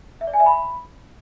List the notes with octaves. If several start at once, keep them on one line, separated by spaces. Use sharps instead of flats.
E5
D5
G#5
E5
B5